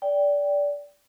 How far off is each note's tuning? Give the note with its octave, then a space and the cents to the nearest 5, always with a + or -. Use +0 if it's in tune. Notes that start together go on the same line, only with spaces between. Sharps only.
D5 -20 G5 +0